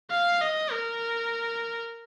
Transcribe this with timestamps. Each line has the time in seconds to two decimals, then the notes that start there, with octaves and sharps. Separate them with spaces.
0.11 F5
0.41 D#5
0.71 A#4